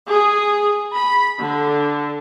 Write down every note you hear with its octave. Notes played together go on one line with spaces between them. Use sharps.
G#4
B5
D3